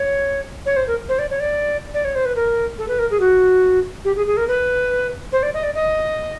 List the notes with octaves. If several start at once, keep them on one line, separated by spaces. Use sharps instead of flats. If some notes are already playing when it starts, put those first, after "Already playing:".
Already playing: C#5
C#5
C5
A#4
C5
D5
C#5
D5
D5
C#5
C5
B4
A#4
A4
B4
A#4
G#4
F#4
G4
G#4
G#4
A#4
B4
C5
D5
D#5
D5
D#5